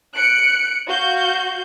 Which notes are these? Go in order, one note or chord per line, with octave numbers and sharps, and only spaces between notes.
F#6 C#7 D7
F#4 F5 G6